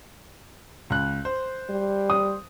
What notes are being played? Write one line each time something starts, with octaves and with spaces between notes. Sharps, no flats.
C#2 F#6
C5
G3
D#6